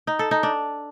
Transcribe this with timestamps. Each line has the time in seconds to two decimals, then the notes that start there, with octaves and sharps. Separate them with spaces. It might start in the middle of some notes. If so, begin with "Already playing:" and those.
0.07 D#4
0.19 A4
0.31 D#4
0.43 D4